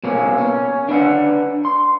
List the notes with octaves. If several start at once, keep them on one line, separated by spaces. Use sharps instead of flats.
B2 A#3 C#4
C#4
D4 B4 E5 F#5
C6